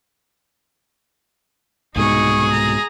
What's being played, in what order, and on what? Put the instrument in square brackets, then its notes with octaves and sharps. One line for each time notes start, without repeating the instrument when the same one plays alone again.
[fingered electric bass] C2 G#2 B2 [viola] D#4 C#6 [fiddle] G#4
[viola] A#5